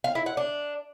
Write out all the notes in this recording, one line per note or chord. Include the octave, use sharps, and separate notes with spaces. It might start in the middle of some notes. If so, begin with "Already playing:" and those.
F5
E4
F#5
D4